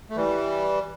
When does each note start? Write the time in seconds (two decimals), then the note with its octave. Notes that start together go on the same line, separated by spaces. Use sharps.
0.10 A3
0.16 E3 G3